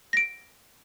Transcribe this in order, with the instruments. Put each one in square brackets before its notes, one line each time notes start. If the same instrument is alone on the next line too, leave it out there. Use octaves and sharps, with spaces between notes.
[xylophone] A#6 D7